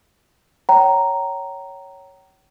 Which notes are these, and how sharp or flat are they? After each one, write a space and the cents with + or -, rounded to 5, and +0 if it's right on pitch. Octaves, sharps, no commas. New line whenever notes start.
C#5 +5 G5 -40 A#5 +0